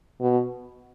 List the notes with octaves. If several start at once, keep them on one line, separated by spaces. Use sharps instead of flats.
B2